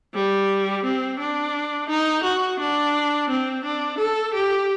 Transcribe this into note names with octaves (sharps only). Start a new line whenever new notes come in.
G3
C4
D4
D#4
F#4
D4
C4
D4
A4
G4